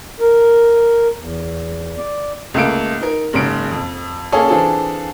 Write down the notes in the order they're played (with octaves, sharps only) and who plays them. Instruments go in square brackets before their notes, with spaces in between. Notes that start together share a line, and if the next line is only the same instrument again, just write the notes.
[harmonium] A#4
E2
D5
[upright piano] C#2 A3 A#3 D7
D#4 A#4
F#1 G#2 C#3 D7
F2
A#3 C#4 G#4 A4 C#5
E3 C4 D4 F4 G#4 A4